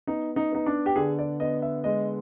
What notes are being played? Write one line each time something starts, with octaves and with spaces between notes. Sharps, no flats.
B3 D#4
D#4
B3 D#4
D4
G4
D3 G#4
D5
B3 D#5
E5
G#3 D#5